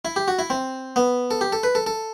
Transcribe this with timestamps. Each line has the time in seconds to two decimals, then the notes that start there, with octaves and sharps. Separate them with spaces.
0.05 E4
0.16 G4
0.28 F#4
0.39 E4
0.50 C4
0.96 B3
1.31 A4
1.41 G4
1.52 A4
1.63 B4
1.75 A4
1.86 A4